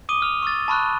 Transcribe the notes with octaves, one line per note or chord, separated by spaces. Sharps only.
D6 D#6 D#7 G7
D#6 F6 F7
C#6 E6 F6 A6
A5 B5 C#6 F6 F#6